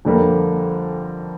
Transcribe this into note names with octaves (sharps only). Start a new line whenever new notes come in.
F2 D3 G3 A#3